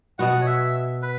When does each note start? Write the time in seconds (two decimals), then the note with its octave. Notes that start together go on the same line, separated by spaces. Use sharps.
0.19 B2 B3 F#4 F#5
0.41 C#5
0.46 E5
1.02 B4